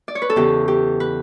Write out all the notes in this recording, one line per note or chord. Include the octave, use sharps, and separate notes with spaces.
D5
C#5
B4
A4
E2 C#3 E3 G4
G4
B4